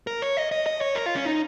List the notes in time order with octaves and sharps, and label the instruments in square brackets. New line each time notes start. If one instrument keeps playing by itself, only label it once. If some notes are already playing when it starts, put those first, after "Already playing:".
[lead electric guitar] A#4
C#5
D#5
D#5
D#5
C#5
A#4
F4
C#4
D#4